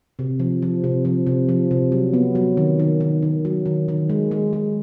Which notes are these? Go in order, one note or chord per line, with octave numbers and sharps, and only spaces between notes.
C3
F3
F3
C3
F3
C3
F3
C3
F#3
B3
F#3
D#3
D#3
D#3
D#3
F#3
D#3
D#3
G#3
G#3
G#3